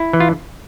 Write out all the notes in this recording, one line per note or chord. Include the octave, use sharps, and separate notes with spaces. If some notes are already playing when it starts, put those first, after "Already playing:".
Already playing: E4
E3
F4